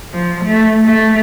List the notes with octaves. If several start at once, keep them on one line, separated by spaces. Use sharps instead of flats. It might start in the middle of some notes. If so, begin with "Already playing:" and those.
F3
A3
A3